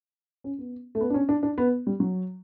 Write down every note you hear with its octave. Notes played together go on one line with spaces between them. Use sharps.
C#4
B3
A3
B3
D4
C#4
D4
D4
B3
G3
F#3